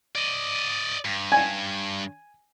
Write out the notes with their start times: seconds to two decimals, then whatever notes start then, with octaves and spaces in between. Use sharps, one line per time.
0.16 D5 D#5
1.05 G2
1.32 G#5